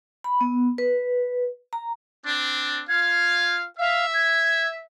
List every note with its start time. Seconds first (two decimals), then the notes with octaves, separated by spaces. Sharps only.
0.24 B5
0.41 B3
0.78 B4
1.73 A#5
2.26 C4 D4
2.89 F4 F5 G#6
3.79 E5 F5
4.14 G#6